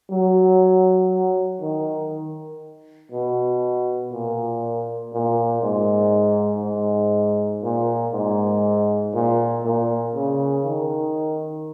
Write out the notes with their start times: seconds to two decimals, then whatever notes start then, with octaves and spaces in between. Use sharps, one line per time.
0.11 F#3
1.61 D#3
3.12 B2
4.12 A#2
5.13 A#2
5.62 G#2
6.63 G#2
7.63 A#2
8.13 G#2
9.13 A#2
9.63 A#2
10.14 C#3
10.64 D#3